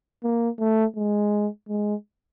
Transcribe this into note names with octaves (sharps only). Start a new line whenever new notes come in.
A#3
A3
G#3
G#3